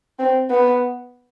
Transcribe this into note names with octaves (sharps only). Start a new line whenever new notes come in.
C4
B3